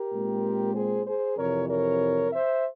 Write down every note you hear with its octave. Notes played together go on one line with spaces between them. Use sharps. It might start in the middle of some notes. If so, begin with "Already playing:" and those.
Already playing: G4 A#4
A#2 G#3 C4
G#4 C5
G#4 C5
F2 C3 E3 A#4 C#5
A#4 C#5
C5 E5